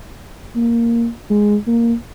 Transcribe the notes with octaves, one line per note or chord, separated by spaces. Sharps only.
A#3
G#3
A#3